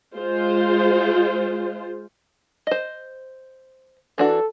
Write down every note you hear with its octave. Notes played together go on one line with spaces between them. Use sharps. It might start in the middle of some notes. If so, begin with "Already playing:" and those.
G#3 F4 C5
C5 D#5
E3 D4 F#4 A4